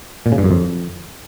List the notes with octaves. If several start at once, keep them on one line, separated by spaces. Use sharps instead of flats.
A#2
C#3
G2
F#2
F2